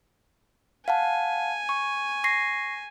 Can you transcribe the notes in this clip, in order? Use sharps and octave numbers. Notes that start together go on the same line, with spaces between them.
F5 F#5 G#5 A5
C#6
C#6 A#6 C7